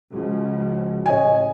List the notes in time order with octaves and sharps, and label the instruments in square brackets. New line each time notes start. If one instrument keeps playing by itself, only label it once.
[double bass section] C#2 C#3 F3 [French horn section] G#3 F#4
[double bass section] A1 [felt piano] C#5 D#5 G#5